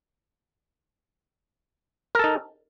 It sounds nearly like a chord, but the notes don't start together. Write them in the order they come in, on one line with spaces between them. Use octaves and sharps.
A#4 A4 D#4